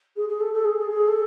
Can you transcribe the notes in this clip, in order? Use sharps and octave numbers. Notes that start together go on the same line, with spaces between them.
G#4
G#4
A4
A4
G#4
G#4
G#4
A4